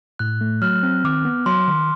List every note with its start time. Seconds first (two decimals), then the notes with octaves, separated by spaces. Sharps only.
0.19 A2 F#6
0.41 A3
0.62 F#3 F6
0.83 C4
1.04 D#3 D6
1.25 B3
1.46 F#3 C6
1.68 D#3